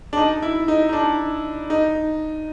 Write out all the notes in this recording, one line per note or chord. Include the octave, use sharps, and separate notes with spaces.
D4
D#4
E4
D#4
D#4
D4
D#4